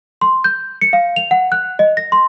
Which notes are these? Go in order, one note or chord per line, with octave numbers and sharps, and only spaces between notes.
C6
G6
C#7
F5
F7
F#5
F#6
D#5
A#6
C6